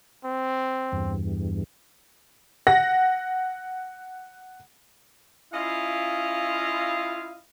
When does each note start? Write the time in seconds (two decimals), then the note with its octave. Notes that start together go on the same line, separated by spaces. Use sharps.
0.25 C4
0.92 E2 G2
2.67 F#5 A#6
5.53 C#4 E4 F4 D#5 F5